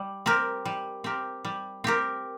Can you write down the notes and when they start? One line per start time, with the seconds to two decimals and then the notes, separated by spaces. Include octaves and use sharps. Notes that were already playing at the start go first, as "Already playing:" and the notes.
Already playing: G3
0.26 C4 G4 A#4
0.65 G3
1.04 C4 G4 A#4
1.45 G3
1.84 C4 G4 A#4